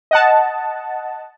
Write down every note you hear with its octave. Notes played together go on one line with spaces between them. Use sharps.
D#5 F#5 A5